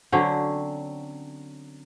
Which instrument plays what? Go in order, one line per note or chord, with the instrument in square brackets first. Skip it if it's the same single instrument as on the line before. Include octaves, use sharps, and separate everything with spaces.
[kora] D3 F#3 C4 C#4